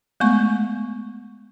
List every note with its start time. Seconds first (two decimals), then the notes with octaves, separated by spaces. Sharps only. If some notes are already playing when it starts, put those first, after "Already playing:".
0.20 G#3 A3 B3 C#6